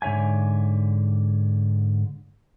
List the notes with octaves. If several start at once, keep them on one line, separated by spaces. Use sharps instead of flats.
G#2 D3 C#5 E5 G#5